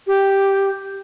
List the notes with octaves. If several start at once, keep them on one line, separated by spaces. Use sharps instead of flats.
G4